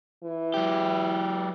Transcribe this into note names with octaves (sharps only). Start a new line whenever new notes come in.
E3
F#3 G4